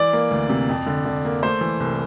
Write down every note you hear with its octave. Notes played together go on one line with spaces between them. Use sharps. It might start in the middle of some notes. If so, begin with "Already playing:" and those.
Already playing: E3 D5
A#3
D2
C3
F2
D3
D3
A#3
A3 C5
E3
C2